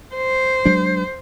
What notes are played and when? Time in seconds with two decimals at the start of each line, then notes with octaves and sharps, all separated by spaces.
0.15 C5
0.65 F#3 G#3 D4